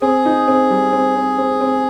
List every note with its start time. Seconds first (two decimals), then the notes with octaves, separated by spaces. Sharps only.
0.01 C4 G#4
0.25 D#4
0.48 C4
0.70 G3
0.93 C4
1.16 C4
1.38 C4
1.61 C4